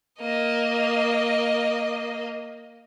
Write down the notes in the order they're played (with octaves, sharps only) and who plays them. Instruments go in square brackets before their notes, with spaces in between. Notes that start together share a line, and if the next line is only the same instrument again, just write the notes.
[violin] A#3 D#5